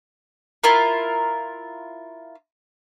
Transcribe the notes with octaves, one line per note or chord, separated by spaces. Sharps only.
E4 F4 A#4